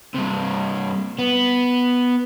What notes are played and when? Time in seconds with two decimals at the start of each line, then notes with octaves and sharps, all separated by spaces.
0.15 G2 C3
1.19 B3